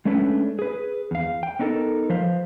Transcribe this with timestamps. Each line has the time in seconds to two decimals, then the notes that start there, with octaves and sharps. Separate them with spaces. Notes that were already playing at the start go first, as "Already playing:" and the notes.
0.05 G#3 A3 C#4 D4 B4
0.59 G#4 B4
1.11 E2 F5
1.43 G5
1.59 B3 C#4 D#4 F4 A4 A#4
2.10 F3 B4 C5 F5